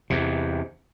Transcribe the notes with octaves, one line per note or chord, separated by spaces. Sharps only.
E2 C3